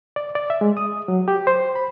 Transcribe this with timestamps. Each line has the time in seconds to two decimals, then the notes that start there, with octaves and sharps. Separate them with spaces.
0.16 D5
0.35 D5
0.50 E5
0.61 G#3
0.77 D#6
1.08 F#3
1.28 G4
1.47 C5
1.75 B5